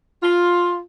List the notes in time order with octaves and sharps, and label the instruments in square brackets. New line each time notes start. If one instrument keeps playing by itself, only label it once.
[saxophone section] F4